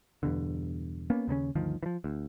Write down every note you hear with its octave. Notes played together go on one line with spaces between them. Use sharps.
E2 G2 B2 D3
A#3 B3 C#4
D#2 C#3 A#3 C#4
G1 D2 D#3 F3
E3 F3
D2